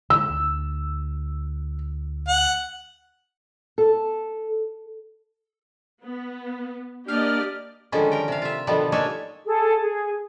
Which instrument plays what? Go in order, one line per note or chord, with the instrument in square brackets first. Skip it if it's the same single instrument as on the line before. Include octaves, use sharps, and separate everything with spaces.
[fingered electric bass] D3 G#3 [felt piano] E6
[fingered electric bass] D2
[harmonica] F#5
[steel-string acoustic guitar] A4
[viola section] B3
[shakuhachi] A#3 [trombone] D4 [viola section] G4 D5 D#5 [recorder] F6
[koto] D3 D#3 F3 G3 G#3 C#4
A#4 G5
C3 F5
F4 E5
B2 D3 D#3 F3 G3 B3
A#3 D4 D#4 C#5 E5 G#5
[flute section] G#4 A4
G#4